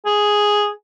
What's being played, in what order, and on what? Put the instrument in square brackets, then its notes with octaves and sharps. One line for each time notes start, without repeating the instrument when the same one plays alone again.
[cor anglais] G#4